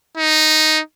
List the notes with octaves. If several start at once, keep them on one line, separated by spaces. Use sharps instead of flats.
D#4